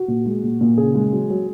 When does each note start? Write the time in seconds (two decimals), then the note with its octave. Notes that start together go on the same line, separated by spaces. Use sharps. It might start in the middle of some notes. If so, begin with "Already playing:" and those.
Already playing: F#4
0.08 A#2
0.26 G#3
0.43 A#2
0.61 A#2
0.78 C#3 G#4
0.95 G#3
1.13 F#3
1.30 F#3